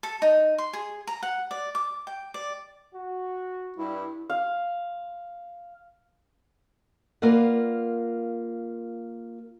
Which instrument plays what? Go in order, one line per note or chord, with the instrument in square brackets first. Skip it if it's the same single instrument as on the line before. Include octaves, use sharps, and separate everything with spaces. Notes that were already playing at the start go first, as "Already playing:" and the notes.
[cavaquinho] A4
D#4
C6
G#4
A#5
F#5
D5
D6
G5
D5
[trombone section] F#4
[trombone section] G2 [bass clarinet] E4
[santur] F5
[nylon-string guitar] A#3 F4 A#4 B4 D5 F#5